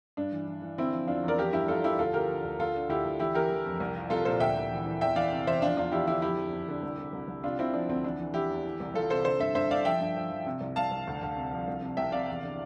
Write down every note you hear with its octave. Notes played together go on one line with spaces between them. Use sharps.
G2 D4
E3
E3
E3
D3 C4 E4
F3
E2 D4 F4
E2
A#4 D5
F3 G4 A#4
G2 E4 G4
G2 F4 A4
F3 E4 G4
D2 F4 A4
D2 G4 A#4
D3
D2
D2 F4 A4
D3
D2 E4 G4
D2
E3 E4 G4
E3 G4 A#4
E3
F2
C2
F3
C2 F4 A4
A#2 A4 C5
D2 E5 G5
D2
E3
E3
E2 E5 G5
E3 D5 F5
C3
E2 C5 E5
F3 D4 F4
E2 D4 F4
E2 E4 G4
D3 E4 G4
F2 E4 G4
F2
F2
D3
C2
C2
C2
C2
C3 D4 F4
C3 C4 E4
F3 D4
D2 C4
E3 D4
E3
E3 E4 G4
E2
E3
C2
C2 F4 A4
C3 A4 C5
D3 A4 C5
G2 C5 E5
G2 C5 E5
G2 D5 F5
F3 E5 G5
G2
F3
F3
C3
C2
C2 F5 A5
C2
D2
D2
C3
F3
C2
C3
C2 E5 G5
C3 D5 F5
E2
D3